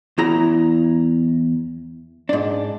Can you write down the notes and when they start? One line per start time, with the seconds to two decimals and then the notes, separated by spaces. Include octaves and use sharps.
0.18 E2 E4 A#5
2.29 G#2 D4